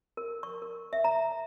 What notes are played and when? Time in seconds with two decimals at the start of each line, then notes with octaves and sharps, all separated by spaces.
0.17 A#4
0.43 C#6
0.62 A#4
0.93 E5
1.04 A#5